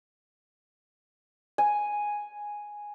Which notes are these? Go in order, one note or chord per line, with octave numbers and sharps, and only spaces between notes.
G#5